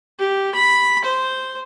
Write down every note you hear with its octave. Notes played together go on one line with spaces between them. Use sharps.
G4
B5
C5